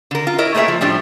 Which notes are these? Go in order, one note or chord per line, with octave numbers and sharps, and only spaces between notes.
D3 A#4
F4
E4 A#4 C#5 D#5
A3 A#3 G#4 C5 E5
F3
A2 F3 G3 D4